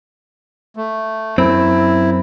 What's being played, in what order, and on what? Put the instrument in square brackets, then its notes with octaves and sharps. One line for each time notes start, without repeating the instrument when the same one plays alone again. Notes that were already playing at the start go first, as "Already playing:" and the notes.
[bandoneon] A3
[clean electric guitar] F#2 C4 [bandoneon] E4